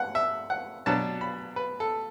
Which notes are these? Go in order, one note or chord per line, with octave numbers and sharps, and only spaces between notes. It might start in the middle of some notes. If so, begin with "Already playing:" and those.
Already playing: F#5
E5
F#5
B2 F#3 D4 A5
B5
B4
A4